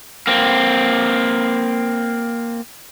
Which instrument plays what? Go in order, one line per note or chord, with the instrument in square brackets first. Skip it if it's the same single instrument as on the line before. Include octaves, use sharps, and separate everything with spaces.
[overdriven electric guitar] A#3 C4